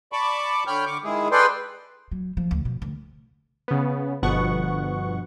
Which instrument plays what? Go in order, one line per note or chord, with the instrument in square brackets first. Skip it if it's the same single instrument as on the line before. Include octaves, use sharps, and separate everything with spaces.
[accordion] D5 A5 B5 C#6 D6
D3 C#5 G5 B5 F6 G6
D3 C#6 D6
D#3 G#3 E4 G#4
G#4 A4 B4 D5 G5 C6
[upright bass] F#3
F3
D2
B2
D2
[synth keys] C#3 B3
G1 B2 F3 B3 F#5 C#6